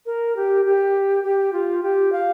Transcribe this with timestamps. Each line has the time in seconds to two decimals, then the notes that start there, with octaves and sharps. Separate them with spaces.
0.06 A#4
0.36 G4
0.65 G4
1.24 G4
1.53 F4
1.83 G4
2.12 F5